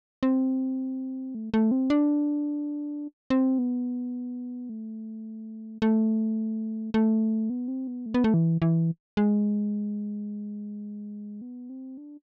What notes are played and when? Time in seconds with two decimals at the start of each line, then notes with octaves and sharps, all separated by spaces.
0.23 C4
1.35 A3
1.54 A3
1.71 C4
1.90 D4
3.30 C4
3.58 B3
4.69 A3
5.82 A3
6.94 A3
7.50 B3
7.68 C4
7.87 B3
8.06 A3
8.14 B3
8.24 A3
8.34 E3
8.62 E3
9.17 G#3
11.42 B3
11.70 C4
11.97 D4